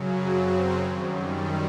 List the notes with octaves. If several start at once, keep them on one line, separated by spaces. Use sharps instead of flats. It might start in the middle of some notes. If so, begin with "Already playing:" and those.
Already playing: F#2 C#3 F#3
C4
F#2 D#3 G3